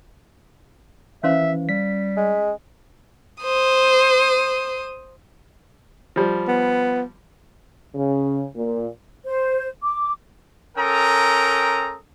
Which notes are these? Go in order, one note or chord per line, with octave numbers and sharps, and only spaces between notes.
E3 C#4 C5 E5 F5
G3 B6
G#3
C5 D#6
F3 G3
B3
C#3
A#2
C5
D6
C#4 A4 A#4 G5 A#5 D#6